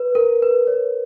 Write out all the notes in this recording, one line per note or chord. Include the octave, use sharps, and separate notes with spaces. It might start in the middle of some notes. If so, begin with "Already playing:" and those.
Already playing: B4
A#4
B4
C#5